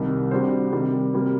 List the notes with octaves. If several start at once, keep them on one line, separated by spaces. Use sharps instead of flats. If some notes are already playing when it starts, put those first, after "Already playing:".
Already playing: C2 C3 D#3 G3
C3 G3 D4 F#4 C5
C3 D#3 G3
C3 G3 A#3